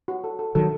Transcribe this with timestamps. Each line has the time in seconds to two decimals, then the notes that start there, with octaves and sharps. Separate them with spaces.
0.08 F#4
0.24 A4
0.39 A4
0.55 D#3 F#3 A4